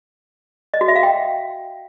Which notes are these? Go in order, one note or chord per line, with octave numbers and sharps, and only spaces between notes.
D#5
F#4
E5
F5
G5